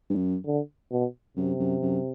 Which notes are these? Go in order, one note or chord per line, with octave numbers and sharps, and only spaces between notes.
G2
F#2
D3
B2
F#2 C3
F#2
F#2